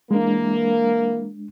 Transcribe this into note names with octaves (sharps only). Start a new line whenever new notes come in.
E3 G#3 A#3 D4